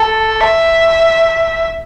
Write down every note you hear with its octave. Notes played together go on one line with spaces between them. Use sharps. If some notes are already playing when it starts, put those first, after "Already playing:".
Already playing: A4
E5